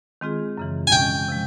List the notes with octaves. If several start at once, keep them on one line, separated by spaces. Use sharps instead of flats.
D#3 G#3 C4 F4 G#4
F#2 C#3 E3
G#5
D#3 G#3 C#4 G5
C3 F3 G#3